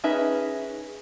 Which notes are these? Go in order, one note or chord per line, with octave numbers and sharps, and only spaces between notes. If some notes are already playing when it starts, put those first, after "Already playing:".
C#4 D#4 G#4 B4 E5